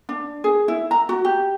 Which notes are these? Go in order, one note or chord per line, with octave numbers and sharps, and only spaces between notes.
D4
G#4
E4
A#5
F#4
G4